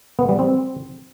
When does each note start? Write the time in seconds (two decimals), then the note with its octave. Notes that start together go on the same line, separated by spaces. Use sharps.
0.19 B3
0.29 G3
0.39 C4